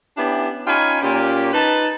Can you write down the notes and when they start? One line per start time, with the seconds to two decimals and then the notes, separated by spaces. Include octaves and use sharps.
0.17 B3 C#4 D4 E4 G4
0.67 C#4 D#4 F4 G5 G#5 B5
1.02 A#2 C#4 G4
1.53 D#4 B4 A5